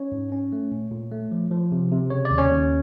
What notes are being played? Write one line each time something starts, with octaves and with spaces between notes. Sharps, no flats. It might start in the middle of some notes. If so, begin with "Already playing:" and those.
Already playing: C#4 C#5
G#2
C#4
A3
A#2
A#2
A3
F3
F3
C3
C3
C#3 C#5
D5
D#2
C#4 C#5
D#2